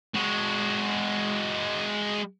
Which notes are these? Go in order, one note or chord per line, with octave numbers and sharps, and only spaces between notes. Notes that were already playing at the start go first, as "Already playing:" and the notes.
G#3 F#4